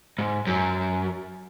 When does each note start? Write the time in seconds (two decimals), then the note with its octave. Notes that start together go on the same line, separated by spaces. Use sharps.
0.19 G#2
0.47 F#2